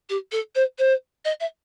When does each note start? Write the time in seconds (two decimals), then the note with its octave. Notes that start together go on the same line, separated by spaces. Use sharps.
0.09 G4
0.32 A4
0.55 C5
0.79 C5
1.25 D#5
1.40 E5